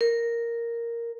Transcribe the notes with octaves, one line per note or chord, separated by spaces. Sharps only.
A#4